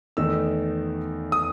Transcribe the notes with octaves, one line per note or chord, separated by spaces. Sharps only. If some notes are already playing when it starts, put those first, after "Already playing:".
E2 D#3 A3 D#4 E6
D#6